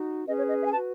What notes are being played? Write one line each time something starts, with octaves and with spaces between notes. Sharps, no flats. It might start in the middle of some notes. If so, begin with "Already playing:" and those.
Already playing: D#4 F#4
C#4 G#4 B4 D#5
C#5
D#5
E5
G#5
F#4 B4 A5